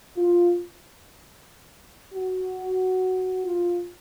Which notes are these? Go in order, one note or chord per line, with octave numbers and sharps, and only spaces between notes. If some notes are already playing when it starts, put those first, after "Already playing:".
F4
F#4
F4